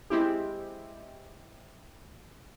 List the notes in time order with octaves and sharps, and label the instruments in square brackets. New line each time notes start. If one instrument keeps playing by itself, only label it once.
[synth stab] G#3 C4 E4 G4